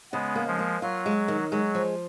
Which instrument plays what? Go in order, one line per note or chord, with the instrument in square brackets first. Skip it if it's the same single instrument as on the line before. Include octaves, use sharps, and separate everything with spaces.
[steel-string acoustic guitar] C#3 [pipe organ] G#3 B3
[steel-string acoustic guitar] A#3
[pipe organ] F3 G#3
[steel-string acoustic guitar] A#3
[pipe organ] F#3 [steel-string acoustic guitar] F4
[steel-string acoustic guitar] G#3
D#3
[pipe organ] F#3 [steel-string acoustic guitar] G#3
[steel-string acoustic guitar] F3